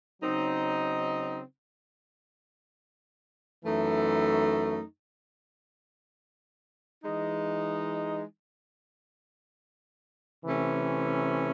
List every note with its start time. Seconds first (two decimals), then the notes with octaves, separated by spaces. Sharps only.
0.21 C#3 F#3 C4 D#4
3.62 F#2 E3 A3 D#4
7.02 E3 G#3 D#4
10.43 C3 E3 A3 C#4